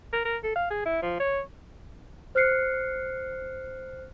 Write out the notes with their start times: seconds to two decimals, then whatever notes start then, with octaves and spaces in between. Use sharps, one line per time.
0.13 A#4
0.25 A#4
0.43 A4
0.55 F5
0.70 G#4
0.85 E4
1.02 F3
1.20 C#5
2.35 C5 F6 F#6 C7 C#7